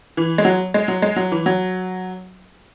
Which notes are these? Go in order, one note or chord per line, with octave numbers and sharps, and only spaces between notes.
E3
G#3
F#3
G#3
F#3
G#3
F#3
E3
F#3